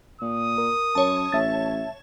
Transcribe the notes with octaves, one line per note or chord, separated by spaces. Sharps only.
A#2 D#6
A#4
F#2 C#5 A5
A1 E5 A6